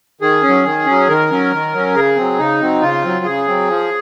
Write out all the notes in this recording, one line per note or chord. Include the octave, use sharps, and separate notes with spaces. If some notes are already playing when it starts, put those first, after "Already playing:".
D#3 G#4
F#3 C#4
D#3
F#3 C#4
D#3 A#4
F#3 C#4
D#3
F#3 C#4
C#3 G#4
F#3 C4
C#3 D#4
F#3 C4
C#3 F4
F#3 C4
C#3 G#4
F#3 C4
F3